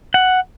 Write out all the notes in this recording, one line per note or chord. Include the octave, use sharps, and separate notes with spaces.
F#5